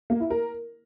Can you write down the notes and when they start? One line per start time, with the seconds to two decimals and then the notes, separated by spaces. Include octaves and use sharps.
0.10 A#3
0.20 E4
0.30 A#4